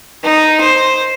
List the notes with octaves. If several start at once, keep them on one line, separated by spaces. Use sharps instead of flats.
D#4
C5